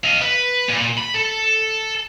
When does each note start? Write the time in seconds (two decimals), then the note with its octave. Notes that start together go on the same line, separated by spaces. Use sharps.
0.04 D#5 F5
0.22 B4
0.68 A#2
0.98 B5
1.15 A4